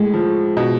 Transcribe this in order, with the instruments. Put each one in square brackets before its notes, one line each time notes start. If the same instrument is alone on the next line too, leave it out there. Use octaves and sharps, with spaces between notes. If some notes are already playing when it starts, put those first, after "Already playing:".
Already playing: [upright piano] A2 [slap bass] G#3
[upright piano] F3
B2